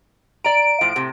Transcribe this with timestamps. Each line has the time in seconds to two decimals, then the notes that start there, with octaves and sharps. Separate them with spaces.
0.44 D5 A#5 D7
0.81 A2 F3
0.96 A2 C3